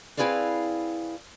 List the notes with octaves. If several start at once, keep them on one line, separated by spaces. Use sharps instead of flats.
C4 E4 G#4 B4 D5 F5